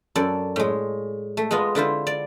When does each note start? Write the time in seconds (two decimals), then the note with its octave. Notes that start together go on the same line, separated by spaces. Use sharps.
0.15 F#2 A4 D5
0.56 A2 G#3
1.37 A3
1.51 G#3 B3 F4 D#5
1.75 D3 E4 F4 C5
2.07 D5